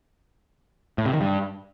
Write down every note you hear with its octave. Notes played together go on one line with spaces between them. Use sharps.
A2
C3
D#3
G2